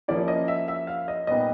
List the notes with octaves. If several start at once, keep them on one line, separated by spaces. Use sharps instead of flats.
F3 A#3 C#4 E4 D5
D#5
E5
E5
F5
D#5
A#2 G3 B3 D#4 D#5